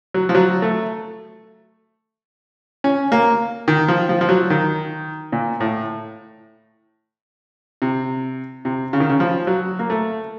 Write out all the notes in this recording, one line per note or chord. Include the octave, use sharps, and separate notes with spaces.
F#3
F3
F#3
A3
C#4
A#3
D#3
F3
F3
F3
F#3
D#3
A#2
A2
C3
C3
C#3
D#3
C#3
F3
F#3
A#3
A3